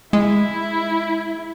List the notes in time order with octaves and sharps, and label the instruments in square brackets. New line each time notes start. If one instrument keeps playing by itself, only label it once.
[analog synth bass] G#3 [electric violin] E4